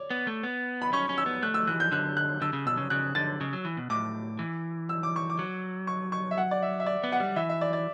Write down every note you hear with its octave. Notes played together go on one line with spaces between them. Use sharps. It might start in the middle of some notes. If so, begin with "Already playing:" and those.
Already playing: C#5 D5
B3
A3
B3
B5
C#4 C#6
C#4
E6
B3
A3 F#6
E6
E3 F#6
G6
D3 F#6
F#6
D3 E6
C#3
B2 E6
C#3
C#3 F#6
D3 A6
C#3
F#3
E3
B2
A2 D6
E3
E6
D6
C#6
D6
F#3
C#6
C#6
E5
F#5
D5
E5
E5
D5
B3
F#5
G3
E3 E5
E5
D5
D5